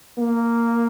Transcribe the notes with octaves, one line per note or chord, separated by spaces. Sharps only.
A#3